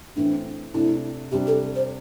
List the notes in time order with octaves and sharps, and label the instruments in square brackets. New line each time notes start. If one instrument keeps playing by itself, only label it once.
[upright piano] A2 E3 C4 [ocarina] D4
[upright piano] C3 A3 D4 [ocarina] E4
[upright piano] C3 G3 D4 [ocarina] G4
[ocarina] A4
C5